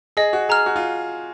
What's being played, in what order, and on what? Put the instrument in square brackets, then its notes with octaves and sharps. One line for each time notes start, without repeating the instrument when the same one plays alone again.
[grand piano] G#4 [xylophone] D#5
[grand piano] F#4
[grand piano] G#4 [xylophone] A#5 F6
[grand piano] F#4
F4